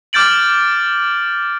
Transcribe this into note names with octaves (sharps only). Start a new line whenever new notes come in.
D6 F6 G6 A6 D7 F#7